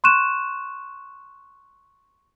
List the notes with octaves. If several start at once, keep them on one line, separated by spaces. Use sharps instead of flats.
C6 C#6 F#6 D#7 E7